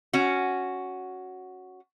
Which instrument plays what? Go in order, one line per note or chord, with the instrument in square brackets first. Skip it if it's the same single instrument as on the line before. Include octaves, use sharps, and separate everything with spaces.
[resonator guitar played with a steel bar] C#4 F#4